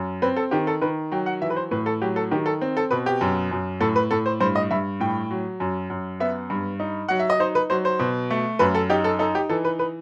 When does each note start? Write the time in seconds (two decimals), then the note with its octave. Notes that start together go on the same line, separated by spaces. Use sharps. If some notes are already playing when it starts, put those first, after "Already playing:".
Already playing: F#2
0.22 C4 B4
0.36 A4
0.51 D#3 G4
0.67 A4
0.81 D#3 B4
1.12 F#3 G5
1.26 F#5
1.41 E3 E5
1.50 B4
1.56 C5
1.71 A2 B4
1.86 A4
2.02 F#3 G4
2.16 A4
2.31 D#3 G4
2.46 A4
2.61 C4
2.77 A4
2.91 B2 B4
3.06 G4
3.21 F#2
3.51 F#2
3.81 A2 A4
3.96 B4
4.11 A2 A4
4.26 C5
4.40 G2 C5
4.55 D#5
4.71 G2 E5
5.00 A2 G5
5.30 F#3
5.60 F#2
5.90 F#2
6.20 B3 E5
6.50 G2
6.80 D#4
7.08 F#3 F#5
7.19 E5
7.30 D#5
7.40 D#4 C5
7.55 B4
7.70 F#3 C5
7.85 C5
7.99 B2
8.30 A3
8.59 F#2 B4
8.75 A4
8.90 D#4 G4
9.04 A4
9.19 D#4 A4
9.35 G4
9.49 E3 A4
9.65 B4
9.79 B4